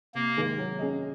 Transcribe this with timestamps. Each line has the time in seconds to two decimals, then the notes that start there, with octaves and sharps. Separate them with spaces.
0.15 C3 A#3
0.37 D#3 G#3 D#4
0.58 F#3
0.79 C#4 G#4 D#5